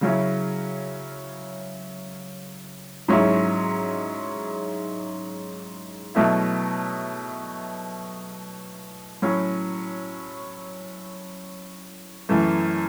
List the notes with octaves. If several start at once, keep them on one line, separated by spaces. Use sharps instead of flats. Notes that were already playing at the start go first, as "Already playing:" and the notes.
C#3 F#3 C#4 E4
G#2 F#3 C#4 E4
B2 F#3 A3 E4
A2 F#3 C#4
F#2 E3 A3